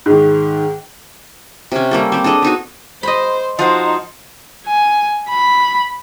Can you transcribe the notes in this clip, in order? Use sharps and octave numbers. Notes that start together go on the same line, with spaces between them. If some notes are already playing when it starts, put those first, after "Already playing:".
G#2 D#3
C3 C#4
G3 A#3 A4
C4 G4
D4 G#4 A4 D#5
B3 D#4 F#4
C5 D#5 B5
F3 D#4 F#4 C5
G#5
B5